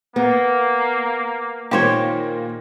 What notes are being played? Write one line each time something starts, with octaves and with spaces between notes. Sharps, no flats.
A#3 B3
A#2 D#3 A#3 G4 C5 C#5